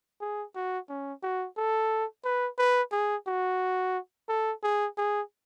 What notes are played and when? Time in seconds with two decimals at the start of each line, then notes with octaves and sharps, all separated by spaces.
0.21 G#4
0.55 F#4
0.89 C#4
1.23 F#4
1.57 A4
2.25 B4
2.58 B4
2.92 G#4
3.27 F#4
4.29 A4
4.63 G#4
4.98 G#4